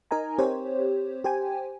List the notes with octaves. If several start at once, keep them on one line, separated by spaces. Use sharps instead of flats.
D#4 A#4 D#5 G#5 A#5
C4 G4 C5 C#5
G4 C5 G5 G#5